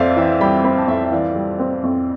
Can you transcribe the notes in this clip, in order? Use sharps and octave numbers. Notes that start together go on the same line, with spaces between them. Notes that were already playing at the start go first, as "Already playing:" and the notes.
Already playing: F2 C4 C5 D5 E5 F5
E3 E5 G5
G3 G5 B5
C4 G5 B5
A5
F2 E5 G5
E5
E3 D5 F5
G3
C4
F2